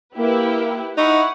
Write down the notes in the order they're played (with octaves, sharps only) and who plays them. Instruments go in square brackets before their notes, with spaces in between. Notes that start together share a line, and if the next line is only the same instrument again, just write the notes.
[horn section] A#3 [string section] E4 G4 B4
[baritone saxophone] D#4 [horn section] E4 [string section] F#5 [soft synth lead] C#6